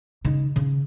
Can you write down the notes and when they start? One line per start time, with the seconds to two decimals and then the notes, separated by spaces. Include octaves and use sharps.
0.25 C#3 D#4
0.56 C#3